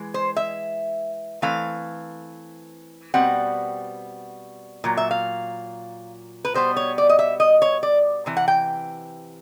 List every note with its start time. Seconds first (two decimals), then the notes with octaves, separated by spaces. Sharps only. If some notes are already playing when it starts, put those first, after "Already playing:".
Already playing: E3 G#3
0.14 C5
0.37 E5
1.42 E3 A3 C4 F5
3.14 B2 G3 C4 F#5
4.84 A#2 F#3
4.97 E5
5.11 F5
6.45 B4
6.54 B2 G3 B3 C5
6.77 C#5
6.98 D5
7.10 D#5
7.19 E5
7.40 D#5
7.62 C#5
7.83 D5
8.26 C3 E3
8.37 F#5
8.48 G5